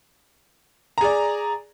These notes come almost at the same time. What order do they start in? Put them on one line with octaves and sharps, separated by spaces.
A#5 G#4 D5